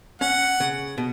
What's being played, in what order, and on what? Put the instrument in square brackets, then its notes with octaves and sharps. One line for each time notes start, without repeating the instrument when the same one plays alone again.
[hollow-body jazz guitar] C#4 [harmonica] F#5
[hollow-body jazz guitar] C#3
B2